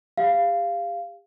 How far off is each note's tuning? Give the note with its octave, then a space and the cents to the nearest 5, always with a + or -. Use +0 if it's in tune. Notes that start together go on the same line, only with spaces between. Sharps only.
G4 +40 F5 -15